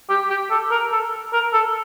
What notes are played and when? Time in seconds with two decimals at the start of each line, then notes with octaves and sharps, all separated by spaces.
0.10 G4
0.30 G4
0.50 A4
0.71 A#4
0.92 A4
1.33 A#4
1.53 A4